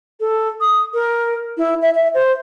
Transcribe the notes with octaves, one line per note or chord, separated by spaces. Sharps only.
A4
D#6
A#4
E4
E5
E5
C5